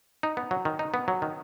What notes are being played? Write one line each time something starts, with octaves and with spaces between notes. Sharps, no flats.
D#4
B3
F#3
D#3
D#4
B3
F#3
D#3